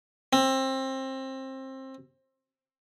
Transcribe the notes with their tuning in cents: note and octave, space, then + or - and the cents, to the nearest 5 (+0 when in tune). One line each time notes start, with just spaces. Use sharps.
C4 +25